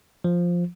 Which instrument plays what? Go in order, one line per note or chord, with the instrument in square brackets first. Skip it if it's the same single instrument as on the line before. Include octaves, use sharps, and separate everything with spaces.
[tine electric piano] F3